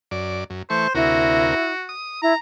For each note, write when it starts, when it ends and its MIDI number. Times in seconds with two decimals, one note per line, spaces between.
0.11 0.44 42
0.11 0.44 74
0.50 0.62 42
0.70 0.87 52
0.70 0.87 57
0.70 0.93 72
0.70 0.87 85
0.95 1.54 38
0.95 1.54 48
0.95 1.73 64
0.95 1.91 66
0.95 1.54 70
1.89 2.21 87
2.22 2.33 64
2.22 2.38 82